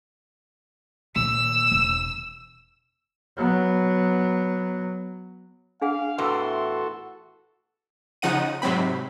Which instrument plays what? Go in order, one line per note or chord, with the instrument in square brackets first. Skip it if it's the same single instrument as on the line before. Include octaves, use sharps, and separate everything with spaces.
[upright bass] A#2 D#3 [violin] E6
[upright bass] E1
[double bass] F#3 B3
[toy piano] D4 G#4 F#5 [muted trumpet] F5
[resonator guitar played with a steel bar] E2 A2 E3 [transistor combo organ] F#4 A4 [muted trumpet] C6
[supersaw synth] C#3 F3 D#4 F#5 D#7
G#2 C3 F#3 C4 B5